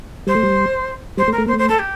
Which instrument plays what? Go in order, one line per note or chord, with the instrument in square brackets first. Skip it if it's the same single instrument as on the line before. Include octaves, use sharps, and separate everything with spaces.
[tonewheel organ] G3 [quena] C5
[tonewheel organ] A3
G3
[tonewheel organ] G3 [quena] C5
[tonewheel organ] A3
[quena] A#4
[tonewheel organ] A3
[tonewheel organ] A#3 [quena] C5
[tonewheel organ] A3
[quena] C5
A4
G4